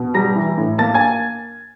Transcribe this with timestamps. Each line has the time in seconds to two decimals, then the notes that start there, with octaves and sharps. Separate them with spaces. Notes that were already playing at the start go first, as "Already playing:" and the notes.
Already playing: B2
0.14 G3 A#5 A#6
0.36 E3
0.57 A2
0.78 A#3 A5 A6
0.94 G#5 G#6